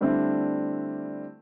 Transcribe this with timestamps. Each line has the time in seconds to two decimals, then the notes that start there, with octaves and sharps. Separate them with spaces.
0.01 D3 G3 A3 C4 D4 E4